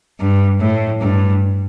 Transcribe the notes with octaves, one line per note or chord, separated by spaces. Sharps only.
G2
A2
G2